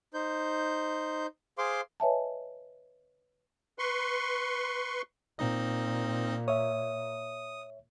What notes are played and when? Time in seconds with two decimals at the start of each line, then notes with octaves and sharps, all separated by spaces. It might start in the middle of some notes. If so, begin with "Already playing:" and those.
0.14 D#4 C5 G6
1.58 G#4 C5 F5 C6 D6
2.00 B4 C#5 D#5 E5 G#5 A5
3.79 B4 C6 C#6
5.39 A#2 C4 D#4 D#5
6.48 C#5 E5 D#6